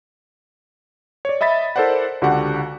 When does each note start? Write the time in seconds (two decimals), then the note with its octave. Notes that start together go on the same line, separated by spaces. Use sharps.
1.25 C#5 D5
1.41 D#5 E5 B5 A6 B6
1.76 E4 A4 A#4 C5 D5 F#5
2.22 C#2 D3 F#4 G4 F#5